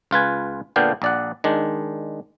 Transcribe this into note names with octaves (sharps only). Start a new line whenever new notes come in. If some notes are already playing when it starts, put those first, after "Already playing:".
C#2 F4 B4 G#5
A#2 D3 B3 D4 F5 G5
A#1 D5 F#5
D#3 G#3 D4